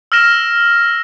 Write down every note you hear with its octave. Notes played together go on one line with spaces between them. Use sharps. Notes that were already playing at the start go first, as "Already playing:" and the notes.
E6 F6 A#6 E7